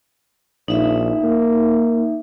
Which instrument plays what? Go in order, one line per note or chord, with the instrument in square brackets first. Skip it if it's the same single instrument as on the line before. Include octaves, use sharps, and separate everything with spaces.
[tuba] A#1 [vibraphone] D#4 E5
[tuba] A#3